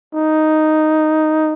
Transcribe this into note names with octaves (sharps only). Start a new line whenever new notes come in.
D#4